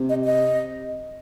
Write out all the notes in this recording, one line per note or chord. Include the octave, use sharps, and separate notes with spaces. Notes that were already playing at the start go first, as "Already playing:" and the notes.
Already playing: C3
D#5
D#5